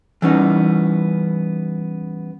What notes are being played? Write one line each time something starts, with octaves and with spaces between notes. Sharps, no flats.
E3 G3 B3 C#4 D#4